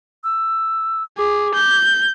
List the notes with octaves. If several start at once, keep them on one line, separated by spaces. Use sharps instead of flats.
E6
G#4 D6
G6